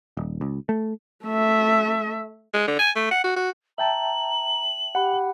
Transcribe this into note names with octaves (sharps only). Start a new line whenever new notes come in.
D#1
C#2
A3
A3 E5
G#3
D3
G#5
A3
F#5
F#4
F#4
E5 G5 A5 A#5 F#7
G4 F#5 B5